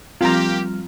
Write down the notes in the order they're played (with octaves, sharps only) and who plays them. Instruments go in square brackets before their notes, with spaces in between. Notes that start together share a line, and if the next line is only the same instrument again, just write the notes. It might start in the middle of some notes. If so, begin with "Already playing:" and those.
[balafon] F3 C4 [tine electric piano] G3 F6 [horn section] A#3 G4 [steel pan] F4 A#5